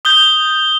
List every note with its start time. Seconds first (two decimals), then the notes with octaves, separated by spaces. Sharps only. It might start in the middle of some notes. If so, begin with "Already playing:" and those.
0.05 D#6 G6 G7